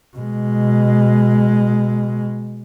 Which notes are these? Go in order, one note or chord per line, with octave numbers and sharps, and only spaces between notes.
B2 G#3